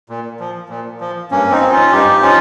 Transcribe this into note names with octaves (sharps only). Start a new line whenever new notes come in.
A#2
F3
A#2
F3
G2 A#3 C#4
C4 D#4
F3
C#4 F4
G2 D#4 G4
F3 C#4 F4